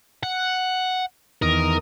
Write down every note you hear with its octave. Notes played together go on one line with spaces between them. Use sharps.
F#5
E2 D#3 A#4 D#6